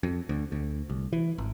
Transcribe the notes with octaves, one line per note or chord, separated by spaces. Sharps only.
F2
D2
D2
C2
E3
G#1